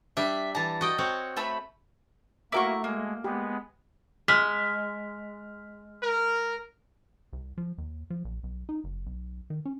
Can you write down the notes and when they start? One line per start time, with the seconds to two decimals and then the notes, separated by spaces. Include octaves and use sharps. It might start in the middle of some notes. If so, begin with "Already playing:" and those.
0.17 G3 D4 E5
0.55 E3 A5 A#5
0.81 F#4 D#5 G5
0.98 C4 F#4 C#5
1.37 A3 E5 B5
2.52 A3 A#3 E4 F#4 A#4 A#5 C#6 D6
2.84 G#3 A#3
3.24 G#3 B3 G4
4.28 G#3 F6 B6
6.03 A#4
7.33 C2
7.58 F3
7.78 D#2
8.10 F3
8.25 A#1
8.43 B1
8.69 D#4
8.84 F#1
9.06 B1
9.50 D#3
9.65 C#4